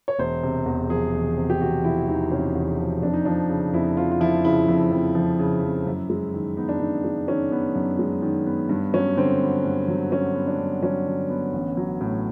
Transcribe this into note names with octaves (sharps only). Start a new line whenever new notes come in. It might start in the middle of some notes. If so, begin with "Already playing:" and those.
C#5
E1 C5
C3
E2
F3 G#4
E1
C3
G4
E2 F#4
F3 E4
E1 D#4
C3 C#4
E2
F3
F2 D4
D#4
F3 D4
C#3
F2 E4
F2 F4
F4
F3 E4
C#3 E4
F2
F2
F3
C#3
F2
F#2
G#3
D#3
B3 D#4
D4
F#2 D#4
G#3
D#3 C#4
B3
F#2
G#3
D#3
B3
G2
F#3 C#4
D3 C4
B3
G2
F#3
D3 C#4
B3
D4
G2
F#3 C#4
D3
B3
A1
F#3
A2